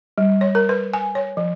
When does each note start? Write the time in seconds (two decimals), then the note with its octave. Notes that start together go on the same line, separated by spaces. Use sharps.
0.18 G3
0.41 C#5
0.55 A#4
0.69 B4
0.93 G#5
1.15 C#5
1.37 F3